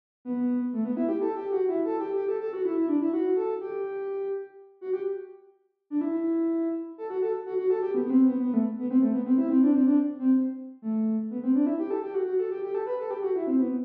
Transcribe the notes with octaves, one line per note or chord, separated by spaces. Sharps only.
B3
A3
B3
E4
G4
A4
G4
F#4
E4
A4
G4
G4
A4
A4
F#4
E4
E4
D4
E4
F#4
A4
G4
F#4
G4
D4
E4
A4
F#4
A4
F#4
F#4
A4
G4
B3
B3
C4
B3
B3
A3
B3
C4
A3
B3
C4
E4
C4
D4
C4
D4
C4
A3
B3
C4
D4
E4
G4
A4
G4
F#4
F#4
A4
G4
G4
A4
B4
A4
G4
F#4
E4
C4
B3